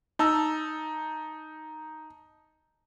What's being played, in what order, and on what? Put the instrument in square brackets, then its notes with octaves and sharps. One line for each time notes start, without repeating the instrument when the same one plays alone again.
[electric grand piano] D#4 A5 E6